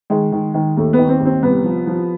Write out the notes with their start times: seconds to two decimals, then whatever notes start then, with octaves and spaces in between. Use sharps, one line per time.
0.10 D#3 G#3
0.32 D#3
0.54 D#3
0.77 D#2 A3
0.93 B3
0.98 D#3
1.09 C4
1.20 D#2
1.25 C4
1.42 C2 B3
1.64 F3
1.87 F3